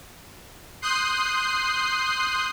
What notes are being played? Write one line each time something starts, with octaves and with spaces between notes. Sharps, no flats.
C6 D#6 F#6 G6 C7